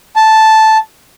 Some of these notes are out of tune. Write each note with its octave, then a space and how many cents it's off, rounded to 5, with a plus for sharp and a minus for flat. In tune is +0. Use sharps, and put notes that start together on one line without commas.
A5 -5